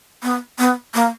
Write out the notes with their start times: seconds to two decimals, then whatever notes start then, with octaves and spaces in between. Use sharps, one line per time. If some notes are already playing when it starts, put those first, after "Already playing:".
0.23 B3
0.59 B3
0.94 A#3